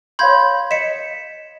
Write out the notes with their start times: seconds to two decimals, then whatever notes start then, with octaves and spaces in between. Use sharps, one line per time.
0.19 C#5 F5 B5 C6 G6 G#6
0.71 D#5 B6 C#7 E7